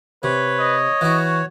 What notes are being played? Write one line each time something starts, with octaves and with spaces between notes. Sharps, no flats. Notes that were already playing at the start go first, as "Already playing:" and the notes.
C3 B4 C#5
D#5
E3 E4 F#4